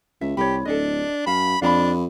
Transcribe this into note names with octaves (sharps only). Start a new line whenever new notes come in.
C#2 E5
C2 G4 C#5 B5
D1 D4 A4 D#5
F#2 F5 A5 B5
F2 D4 F5 A#5 B5